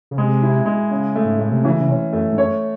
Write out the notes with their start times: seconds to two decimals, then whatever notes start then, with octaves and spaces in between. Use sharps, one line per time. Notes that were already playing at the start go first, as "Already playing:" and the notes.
0.11 C#3
0.17 C3 G#3
0.42 E4
0.66 G#3
0.91 C#3
1.15 A3
1.24 G#2
1.38 A2 A3
1.51 C3
1.64 C#3 E3
1.80 C#3
1.88 C3 C#4
2.13 F#2 A3
2.32 G#2
2.38 F#2 C#5